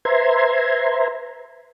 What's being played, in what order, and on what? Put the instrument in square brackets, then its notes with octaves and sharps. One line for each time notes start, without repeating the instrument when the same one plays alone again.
[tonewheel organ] B4 C5 E5 A#5 C6 G#6